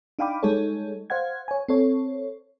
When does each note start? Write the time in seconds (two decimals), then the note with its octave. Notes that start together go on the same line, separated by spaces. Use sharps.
0.19 D4 D#4 F5 G5 B5 D6
0.43 G3 G#3 D#4 G#4 A4 C#5
1.10 C5 F5 F#5 G#6
1.48 C#5 G#5
1.68 C4 A4 C#5